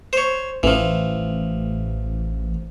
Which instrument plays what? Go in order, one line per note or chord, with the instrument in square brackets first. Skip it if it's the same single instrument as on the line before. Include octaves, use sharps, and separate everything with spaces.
[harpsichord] C5 C#5
[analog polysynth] A1 [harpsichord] E3 F3